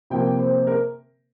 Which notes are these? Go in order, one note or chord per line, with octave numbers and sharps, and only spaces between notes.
C3 F3 A#3 G5
C5
A#4